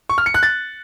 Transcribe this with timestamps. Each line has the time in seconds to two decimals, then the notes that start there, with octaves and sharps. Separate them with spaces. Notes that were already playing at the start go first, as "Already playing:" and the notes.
0.09 C#6
0.18 F6
0.26 C#7
0.34 F#6
0.43 A6